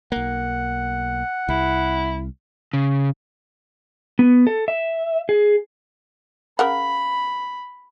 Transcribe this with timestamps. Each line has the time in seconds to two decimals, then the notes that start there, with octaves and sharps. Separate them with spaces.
0.12 B1 A#3 F#5
1.49 C2 E4
2.73 C#3
4.19 B3
4.47 A4
4.68 E5
5.29 G#4
6.59 C#3 A#4 F#5 B5